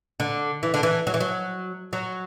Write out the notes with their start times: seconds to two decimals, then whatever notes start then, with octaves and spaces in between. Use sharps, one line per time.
0.20 D3
0.63 E3
0.74 D3
0.83 E3
1.07 F#3
1.14 E3
1.20 F#3
1.93 F#3